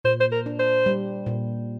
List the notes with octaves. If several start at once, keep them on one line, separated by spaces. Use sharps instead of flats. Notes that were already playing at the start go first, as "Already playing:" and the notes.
A#2 C5
C5
A#4
D4
C5
G3
A#2